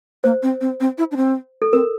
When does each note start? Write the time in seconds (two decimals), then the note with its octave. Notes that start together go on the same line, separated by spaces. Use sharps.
0.24 A#3 C5
0.43 C4
0.61 C4
0.80 C4
0.98 E4
1.11 D4
1.16 C4
1.62 A4
1.72 C4 A#4